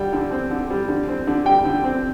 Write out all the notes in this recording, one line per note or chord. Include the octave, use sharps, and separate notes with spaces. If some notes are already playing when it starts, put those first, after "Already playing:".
Already playing: D3 G3 G5
D3
C4
D3
G3
D3
C4
D3
G3 G5
D3
C4